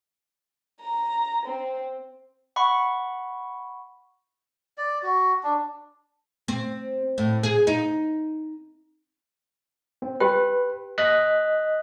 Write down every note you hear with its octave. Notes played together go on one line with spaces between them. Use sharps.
A#5
C4
F#5 B5 C#6
D5
F#4
D4
C4
A2
G#4
D#4
C4
G4 B4 G5
D#5 F#6 B6